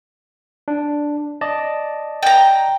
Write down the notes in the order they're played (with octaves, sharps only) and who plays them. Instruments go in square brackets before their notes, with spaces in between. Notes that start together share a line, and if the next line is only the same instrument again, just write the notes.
[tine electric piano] D4
D5 D#5 A5
[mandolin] G5 A#5